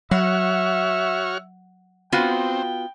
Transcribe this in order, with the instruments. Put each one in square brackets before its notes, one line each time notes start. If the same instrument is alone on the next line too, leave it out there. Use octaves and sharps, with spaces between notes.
[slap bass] F#3 [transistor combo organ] F#4 C#5 F6 [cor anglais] E5 [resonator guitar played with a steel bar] F#5
[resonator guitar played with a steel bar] B3 F4 F#4 [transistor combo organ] C4 [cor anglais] G5